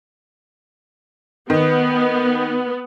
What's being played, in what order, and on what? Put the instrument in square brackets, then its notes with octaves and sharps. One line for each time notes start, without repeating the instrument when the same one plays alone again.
[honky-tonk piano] D#3 [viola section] B3